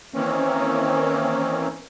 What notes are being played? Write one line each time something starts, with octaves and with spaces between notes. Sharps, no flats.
D#3 E3 A#3 C4 C#4